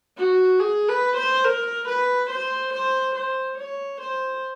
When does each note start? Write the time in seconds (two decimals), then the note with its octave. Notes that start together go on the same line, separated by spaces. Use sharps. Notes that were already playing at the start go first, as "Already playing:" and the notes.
0.18 F#4
0.60 G#4
0.88 B4
1.17 C5
1.45 A#4
1.88 B4
2.30 C5
2.73 C5
3.15 C5
3.58 C#5
4.01 C5